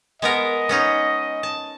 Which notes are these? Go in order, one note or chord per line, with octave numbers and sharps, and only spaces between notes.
G#3 B3 A#4 D#5
B3 C#4 D#4
A5